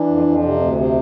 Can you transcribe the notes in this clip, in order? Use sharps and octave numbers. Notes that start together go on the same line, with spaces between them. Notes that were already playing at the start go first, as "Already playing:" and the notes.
Already playing: E3 D4
F2
F2
C3
D2 C4
C3